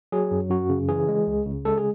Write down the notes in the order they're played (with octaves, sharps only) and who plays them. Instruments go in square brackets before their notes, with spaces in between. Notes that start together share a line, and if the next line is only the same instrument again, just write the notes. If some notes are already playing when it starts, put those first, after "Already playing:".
[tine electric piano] F#3 G#4
F#2
F#2 F#4
C#3
E3 G#4
G#3
C#2
C#3
G#3 A4
G#4